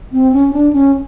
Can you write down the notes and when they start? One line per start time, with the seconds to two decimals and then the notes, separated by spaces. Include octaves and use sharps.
0.12 C4
0.32 C#4
0.53 D4
0.73 C#4